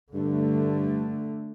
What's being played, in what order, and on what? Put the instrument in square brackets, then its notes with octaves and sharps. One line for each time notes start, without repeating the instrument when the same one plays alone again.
[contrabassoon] G2 [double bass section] D3 A3